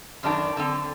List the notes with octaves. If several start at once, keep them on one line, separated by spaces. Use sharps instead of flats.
F#2 D#3 D4 G4 G5 A#5
D3 C4